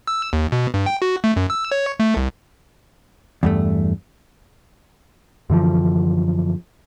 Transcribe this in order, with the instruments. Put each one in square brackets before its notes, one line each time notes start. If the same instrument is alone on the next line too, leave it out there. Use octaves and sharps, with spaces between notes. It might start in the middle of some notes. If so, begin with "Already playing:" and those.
[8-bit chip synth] E6
D#2
B2
G2
G5
F#4
A3
F#2
E6
C#5
A3
C2
[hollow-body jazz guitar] E2 G2 A3
[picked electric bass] F#2 D3 E3 F3